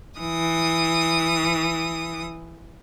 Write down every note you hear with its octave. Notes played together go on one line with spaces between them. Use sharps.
E3 D#6